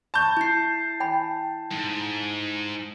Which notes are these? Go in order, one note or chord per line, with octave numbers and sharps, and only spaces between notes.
A5 B5 C#6 G6
E4 C7
G5 G#5 B5
G#2